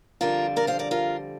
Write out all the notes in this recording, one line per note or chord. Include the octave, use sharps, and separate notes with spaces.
F2 D3 G3 F4 A#4
A#4 D5
C5 F5
A#4 D5
F4 A#4